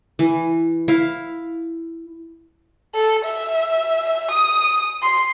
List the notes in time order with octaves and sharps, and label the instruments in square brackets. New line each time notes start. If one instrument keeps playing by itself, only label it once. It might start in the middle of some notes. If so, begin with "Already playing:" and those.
[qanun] E3
E4 F5
[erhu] A4
E5
D#6
C6